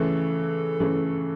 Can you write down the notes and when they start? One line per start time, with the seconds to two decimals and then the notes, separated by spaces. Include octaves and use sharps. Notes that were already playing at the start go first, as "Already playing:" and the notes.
Already playing: C#3 E3 A3 A4
0.80 C#3 E3 A3